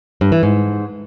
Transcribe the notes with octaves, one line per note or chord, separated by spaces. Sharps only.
G2
E3
G#2